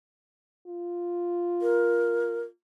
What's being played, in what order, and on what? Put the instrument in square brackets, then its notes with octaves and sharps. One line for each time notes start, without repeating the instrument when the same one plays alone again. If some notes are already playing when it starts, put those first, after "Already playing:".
[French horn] F4
[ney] A#4